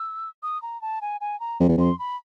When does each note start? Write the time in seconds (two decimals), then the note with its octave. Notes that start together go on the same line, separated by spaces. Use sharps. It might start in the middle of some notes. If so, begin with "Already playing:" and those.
Already playing: E6
0.43 D#6
0.62 A#5
0.82 A5
1.02 G#5
1.21 G#5
1.40 A#5
1.60 F2
1.68 E2
1.78 F2 C6
1.99 B5